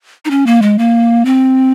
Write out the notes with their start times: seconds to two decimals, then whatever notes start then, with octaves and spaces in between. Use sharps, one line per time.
0.25 D#4
0.31 C#4
0.47 A#3
0.62 G#3
0.78 A#3
1.25 C4